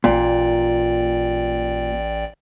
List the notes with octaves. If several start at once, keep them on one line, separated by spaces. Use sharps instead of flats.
A1 A#2 D5 G5